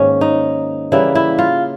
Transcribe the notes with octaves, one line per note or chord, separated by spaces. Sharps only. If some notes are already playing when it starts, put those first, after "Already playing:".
Already playing: G#2 D#3 A#3 C#4
D#4
C#3 E3 G3 A#3 E4
E4
F4